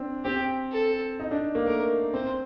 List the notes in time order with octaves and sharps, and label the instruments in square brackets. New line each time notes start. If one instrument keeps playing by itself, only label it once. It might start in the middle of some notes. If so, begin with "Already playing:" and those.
Already playing: [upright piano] C4 D4
[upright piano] C4 [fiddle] G4
[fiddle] A4
[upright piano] D#4
D4
A#3
[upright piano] A3 [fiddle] A#4
[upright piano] C4 [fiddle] C5